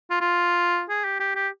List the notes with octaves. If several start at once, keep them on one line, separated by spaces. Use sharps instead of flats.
F4
F4
G#4
G4
G4
G4